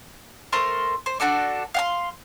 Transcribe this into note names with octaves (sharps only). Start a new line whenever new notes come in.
A3 A#4 C5 C6
C5
D4 F#4 A4 D5
F5 F#5 C6